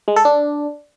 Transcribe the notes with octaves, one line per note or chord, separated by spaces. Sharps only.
G#3
A4
D4